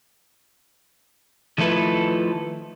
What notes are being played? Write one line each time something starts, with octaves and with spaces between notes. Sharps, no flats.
D#3 F3 A3 E4 A4 B4